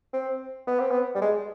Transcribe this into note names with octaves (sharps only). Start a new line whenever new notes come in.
C4
B3
C4
B3
G3
G#3